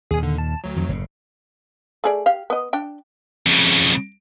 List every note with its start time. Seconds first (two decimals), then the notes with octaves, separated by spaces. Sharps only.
0.11 D#2 A#2 G#4 G#5
0.23 D3
0.38 A5
0.64 D2 F#3
0.76 F2 D#3
0.89 F#1 A2 C#3
2.04 A3 G#4 D5
2.26 G4 F5
2.50 B3 D#5
2.73 D4 G5
3.47 F2 C#3